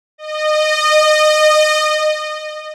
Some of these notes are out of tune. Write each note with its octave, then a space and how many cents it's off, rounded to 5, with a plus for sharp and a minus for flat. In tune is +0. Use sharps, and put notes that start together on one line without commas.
D#5 -25